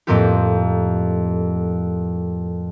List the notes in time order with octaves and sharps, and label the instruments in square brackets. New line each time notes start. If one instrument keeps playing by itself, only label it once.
[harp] F2 A2 A#3 C4 F4 G4